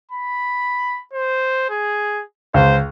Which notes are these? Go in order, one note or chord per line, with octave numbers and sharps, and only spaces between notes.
B5
C5
G#4
C#2 C5